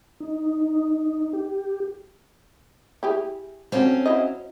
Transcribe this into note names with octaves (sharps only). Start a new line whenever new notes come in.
D#4
G4
E4 G4 G#4
D3 F3 F#3 C4 C#4
F#3 E4 D#5